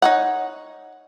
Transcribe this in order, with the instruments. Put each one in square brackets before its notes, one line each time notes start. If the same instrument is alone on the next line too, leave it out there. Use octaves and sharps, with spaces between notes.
[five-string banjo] D#4 C#5 F#5